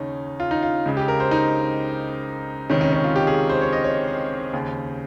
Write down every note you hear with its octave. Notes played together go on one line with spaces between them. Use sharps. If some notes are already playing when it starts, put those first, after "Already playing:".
Already playing: D#2 C#3 C#4 D#4
F4
D#4
F4
C#2 C#3
G4
A#4
C5
D#4
C#2 C3 D#3 C#4
C#4
C#4
F4
G4
G#4
C5
C#5
D#5
C#5
C5
D#2 C#3